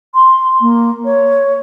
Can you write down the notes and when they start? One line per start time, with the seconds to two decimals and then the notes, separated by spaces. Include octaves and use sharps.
0.14 C6
0.61 A#3
1.05 C#5